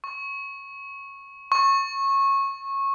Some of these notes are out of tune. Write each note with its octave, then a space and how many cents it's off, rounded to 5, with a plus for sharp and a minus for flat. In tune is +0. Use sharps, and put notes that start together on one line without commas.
C#6 -15
C#6 -20